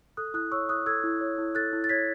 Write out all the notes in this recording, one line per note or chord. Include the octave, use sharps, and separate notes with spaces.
A4 D#6 F#6
E4 D#6 F#6
C#5 C#6 E6
E4 D#6 F#6
A4 E6 G#6
E4
C#5
E4
A4 F#6 A6
E4
A6
C#5 G#6 B6